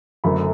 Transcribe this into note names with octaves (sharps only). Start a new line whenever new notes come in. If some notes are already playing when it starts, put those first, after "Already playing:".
F#1 F#2 D3 A3 B5